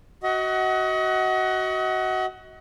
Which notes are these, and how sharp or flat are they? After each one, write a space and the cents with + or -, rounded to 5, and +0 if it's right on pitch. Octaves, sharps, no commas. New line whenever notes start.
F#4 +15 D#5 +35 F#5 +10